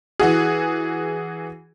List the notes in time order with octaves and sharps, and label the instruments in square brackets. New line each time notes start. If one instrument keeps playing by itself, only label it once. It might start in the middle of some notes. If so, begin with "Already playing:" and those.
[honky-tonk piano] E3 F#4 G#4